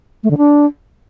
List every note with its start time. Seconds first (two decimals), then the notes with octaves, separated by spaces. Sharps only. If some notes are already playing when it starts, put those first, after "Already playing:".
0.23 A3
0.30 D3
0.37 D4